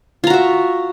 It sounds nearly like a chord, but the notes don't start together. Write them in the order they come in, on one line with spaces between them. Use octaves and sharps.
F4 A#5 F#4 E5